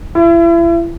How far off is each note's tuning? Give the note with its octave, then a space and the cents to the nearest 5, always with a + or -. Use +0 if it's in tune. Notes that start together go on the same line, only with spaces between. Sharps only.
E4 +35